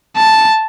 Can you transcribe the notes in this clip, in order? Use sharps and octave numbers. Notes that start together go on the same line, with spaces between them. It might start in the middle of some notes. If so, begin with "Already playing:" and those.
A5